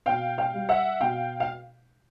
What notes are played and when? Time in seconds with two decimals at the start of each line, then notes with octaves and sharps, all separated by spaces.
0.06 B2 F5 G5
0.38 F5 G5
0.54 G3
0.69 E5 F#5
1.01 B2 F5 G5
1.40 F5